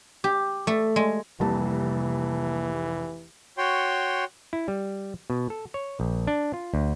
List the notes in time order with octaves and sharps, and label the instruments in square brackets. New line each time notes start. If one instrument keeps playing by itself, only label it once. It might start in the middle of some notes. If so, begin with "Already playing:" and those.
[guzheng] G4
A3
G#3
[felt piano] F1 C2 A5 [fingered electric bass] C3 G3 A#3 [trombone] E3
[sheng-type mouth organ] F#4 C#5 G5 C6
[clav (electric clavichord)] E4
G3
B2
A4
C#5
A#1
D4
F4
D2